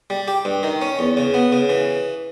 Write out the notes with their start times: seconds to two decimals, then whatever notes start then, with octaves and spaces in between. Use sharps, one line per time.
0.10 G3
0.28 G4
0.45 G2
0.63 D#3
0.82 C#4
0.99 E2
1.17 C#3
1.34 B3
1.52 C#3
1.69 E3